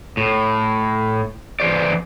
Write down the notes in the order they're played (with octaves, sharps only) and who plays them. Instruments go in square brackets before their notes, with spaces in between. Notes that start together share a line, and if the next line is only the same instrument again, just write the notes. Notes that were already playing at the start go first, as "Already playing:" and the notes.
[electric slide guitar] A2
E3 C5 D5